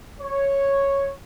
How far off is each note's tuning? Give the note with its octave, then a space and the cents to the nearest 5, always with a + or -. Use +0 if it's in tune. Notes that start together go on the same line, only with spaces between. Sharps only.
C#5 -5